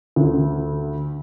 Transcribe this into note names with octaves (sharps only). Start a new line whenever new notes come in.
D2